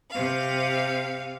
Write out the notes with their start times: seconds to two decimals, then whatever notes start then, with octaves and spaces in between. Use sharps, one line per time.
0.11 C3 F5